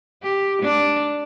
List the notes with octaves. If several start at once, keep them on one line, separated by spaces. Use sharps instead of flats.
G4
D4